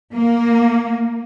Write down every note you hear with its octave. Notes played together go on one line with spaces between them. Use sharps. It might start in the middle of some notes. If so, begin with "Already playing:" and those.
A#3